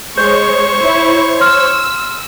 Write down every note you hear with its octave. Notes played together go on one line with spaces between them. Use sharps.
G#3 C5 C#5 C#6 G6
E4
C6 E6 F6